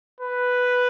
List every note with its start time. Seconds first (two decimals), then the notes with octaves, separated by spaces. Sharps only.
0.21 B4